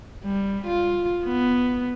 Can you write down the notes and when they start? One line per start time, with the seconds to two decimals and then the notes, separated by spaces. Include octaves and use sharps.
0.24 G3
0.67 F4
1.25 B3